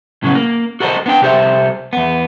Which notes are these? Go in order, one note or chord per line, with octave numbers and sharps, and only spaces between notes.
A2 C#3 F#3 B3
A#3
F#4 A4 A#4 C5 D#5
B3 D4 G5
C2 G4 A4 C5 E5
E2 B3